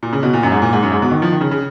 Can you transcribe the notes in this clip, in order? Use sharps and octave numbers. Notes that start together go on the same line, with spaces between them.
A#2
C#3
B2
A#2
F#2
G#2
A#2
G#2
F#2
G#2
B2
D#3
F3
D#3
C#3
C#3